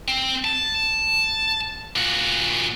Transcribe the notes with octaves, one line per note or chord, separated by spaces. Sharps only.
C4
A5
A#2 F#4